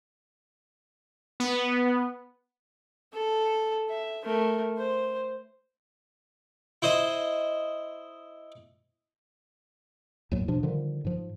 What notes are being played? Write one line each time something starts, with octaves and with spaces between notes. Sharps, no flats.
B3
A4
E5
A3 A#4
C5
E4 C5 D#5 D#6
D#2 A2 F#3
B2 F3 D4
D3 D#3 F3 G3
G#2 F3